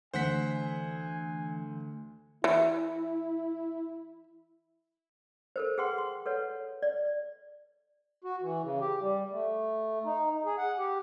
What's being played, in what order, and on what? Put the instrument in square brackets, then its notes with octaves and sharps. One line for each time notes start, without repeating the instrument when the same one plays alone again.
[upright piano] D2 [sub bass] E3 [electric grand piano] C5 F#5 B6 [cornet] G#5
[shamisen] E3 [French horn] E4
[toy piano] A4 A#4 C5
G#4 B4 F#5 G5 C6
C6
A4 B4 C#5 F#5
D5
[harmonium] F#4
E3
C#3
G4
G3
A3
D#4
G#4
F#5
G4